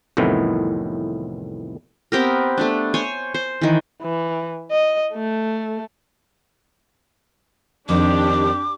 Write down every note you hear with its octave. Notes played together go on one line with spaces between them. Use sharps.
C2 F2 A2 D#3 E3 B3
B3 C4 G4 A#4
A3 B3 D4
C5 C#5 G#5
C5
D#3 E3
E3
D#5
A3
F2 D#3 D4 G4 D6